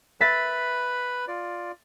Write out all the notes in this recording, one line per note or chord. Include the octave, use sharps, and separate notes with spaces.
B4 E5 B5 A6 B6
F4 D5